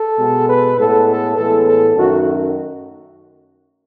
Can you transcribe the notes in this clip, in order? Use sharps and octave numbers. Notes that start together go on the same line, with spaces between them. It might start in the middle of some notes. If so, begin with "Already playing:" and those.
Already playing: A4
B2 G#3 B3
B4
A2 G#3 B3 A4
A4
A2 E3 G#3 B3 A4
A4
F#2 D#3 A3 F#4